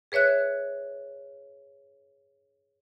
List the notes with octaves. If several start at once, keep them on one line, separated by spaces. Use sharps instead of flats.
G#4 B4 C#5 E5 F#6